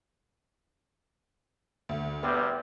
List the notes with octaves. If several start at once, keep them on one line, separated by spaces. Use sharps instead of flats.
D2
E2 C3 G3 B3